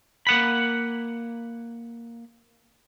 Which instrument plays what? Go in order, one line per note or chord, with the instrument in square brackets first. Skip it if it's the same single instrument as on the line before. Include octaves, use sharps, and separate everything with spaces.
[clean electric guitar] A#3 F#5 B5